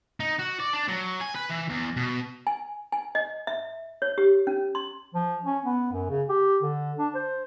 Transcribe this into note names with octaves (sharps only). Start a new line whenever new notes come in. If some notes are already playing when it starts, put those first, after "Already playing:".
D#4
F#4
D5
D4
F#3
G#5
B4
E3
E2
B2
G#5
G#5
D#5
E5
C#5
G4
C#4
C6
F3
C#4
B3
F#2
C#3
G4
D3
D4
C5